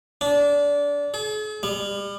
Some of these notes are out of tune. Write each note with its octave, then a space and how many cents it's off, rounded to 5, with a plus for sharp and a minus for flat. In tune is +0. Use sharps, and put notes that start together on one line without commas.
D4 -25
G#4 +45
G3 +30